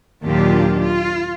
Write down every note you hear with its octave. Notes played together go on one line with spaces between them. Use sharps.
D#2 A#2 F#3 D4 F4 G4
F4